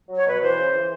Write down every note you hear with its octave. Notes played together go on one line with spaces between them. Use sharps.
F#3
C#5
B2 B4
E3 C5
C#3
E3